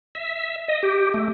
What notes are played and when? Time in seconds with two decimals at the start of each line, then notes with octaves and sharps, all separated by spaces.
0.15 E5
0.68 D#5
0.83 G4
1.14 A3